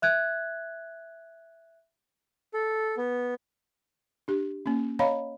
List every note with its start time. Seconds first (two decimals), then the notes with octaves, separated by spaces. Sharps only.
0.02 E5 F#6 G#6
2.54 A4
2.97 B3
4.28 D4 G4
4.66 A#3 C#4
4.99 C#5 D#5 F5 A#5 B5